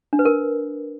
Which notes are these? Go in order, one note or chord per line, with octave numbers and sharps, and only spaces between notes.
D4
B4
A#4